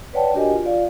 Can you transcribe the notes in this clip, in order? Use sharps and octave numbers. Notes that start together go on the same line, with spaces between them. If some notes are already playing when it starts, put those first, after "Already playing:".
B4 C#5 D5 F#5 G5 A5
D4 F#4 G4 A#4 D#5 G#5
F4
F4 D5 F5